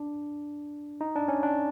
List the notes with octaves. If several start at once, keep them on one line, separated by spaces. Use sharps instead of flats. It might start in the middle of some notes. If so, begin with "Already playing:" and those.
Already playing: D4
D#4
D4
C#4
D4